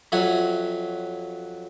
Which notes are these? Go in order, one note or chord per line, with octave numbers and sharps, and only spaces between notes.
F2 F#3 F4 E5 F#5 G#5